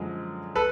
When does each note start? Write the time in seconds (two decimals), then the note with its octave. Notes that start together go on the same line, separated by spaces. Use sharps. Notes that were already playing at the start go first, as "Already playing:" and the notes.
Already playing: F#2 D3 F3 G#3
0.55 A4 B4